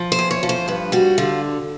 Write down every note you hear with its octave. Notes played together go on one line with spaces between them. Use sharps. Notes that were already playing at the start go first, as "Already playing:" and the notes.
Already playing: F3
C5
E2
C#5
F3
C5
G2 B4
G3 F#4
D3 F4